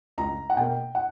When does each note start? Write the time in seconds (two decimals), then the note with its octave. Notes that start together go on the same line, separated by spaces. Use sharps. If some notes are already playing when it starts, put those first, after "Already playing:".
0.18 C#2 A#5
0.50 F#5
0.57 B2 A#3 G5
0.95 F#5